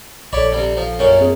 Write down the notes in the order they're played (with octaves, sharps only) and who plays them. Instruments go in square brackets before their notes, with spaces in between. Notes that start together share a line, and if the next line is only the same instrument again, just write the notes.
[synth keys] A#1 A4 [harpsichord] C#5 D5 B5
[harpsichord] C3 G3
F3
F#2 A#2 C#4
[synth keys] C4 G#4